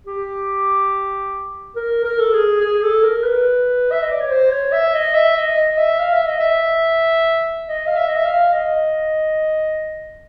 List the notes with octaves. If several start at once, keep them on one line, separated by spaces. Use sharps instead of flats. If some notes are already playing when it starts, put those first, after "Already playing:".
G4
A#4
A#4
A4
G#4
G#4
A4
A#4
B4
E5
D#5
D5
C#5
C5
C#5
E5
D#5
E5
D#5
D#5
E5
F5
E5
D#5
E5
D#5
F5
E5
D#5
E5
F5
D#5